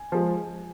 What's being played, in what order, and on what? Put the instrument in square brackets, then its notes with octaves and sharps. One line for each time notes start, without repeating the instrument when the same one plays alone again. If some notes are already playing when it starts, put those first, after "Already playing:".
Already playing: [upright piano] G#5
F3 G#3